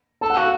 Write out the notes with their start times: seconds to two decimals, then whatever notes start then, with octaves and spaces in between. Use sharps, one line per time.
0.21 A4 A5
0.30 F#5
0.37 F#4 F5